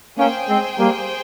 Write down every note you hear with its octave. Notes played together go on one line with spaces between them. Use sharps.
A#3 C#4 G#4 C5 G5
G#3 C4
G3 A#3